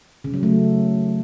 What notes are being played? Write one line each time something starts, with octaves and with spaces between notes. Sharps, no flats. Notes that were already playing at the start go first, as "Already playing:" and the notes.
C#3
F#3
A3